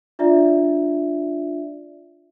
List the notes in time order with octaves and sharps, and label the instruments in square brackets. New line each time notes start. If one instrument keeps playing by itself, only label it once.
[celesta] D4 F4 D5 E5